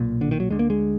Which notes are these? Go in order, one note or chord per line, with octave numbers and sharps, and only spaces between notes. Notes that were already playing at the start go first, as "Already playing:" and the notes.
Already playing: B1 A#2
D3
D#3
F#3
D2 D3 G#3
A#3
G#3